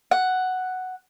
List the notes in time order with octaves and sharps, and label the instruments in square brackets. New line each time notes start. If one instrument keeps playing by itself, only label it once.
[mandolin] F#5